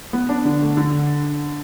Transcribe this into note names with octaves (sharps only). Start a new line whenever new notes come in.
B3
D4
D3
A3
D3